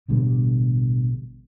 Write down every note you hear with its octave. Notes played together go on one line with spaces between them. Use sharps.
A1 B2 D3 G3